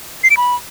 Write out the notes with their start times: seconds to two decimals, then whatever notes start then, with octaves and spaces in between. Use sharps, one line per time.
0.24 C7
0.30 D7
0.37 B5